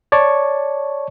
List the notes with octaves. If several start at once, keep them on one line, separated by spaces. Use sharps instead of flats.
C#5 D5 A5 C#6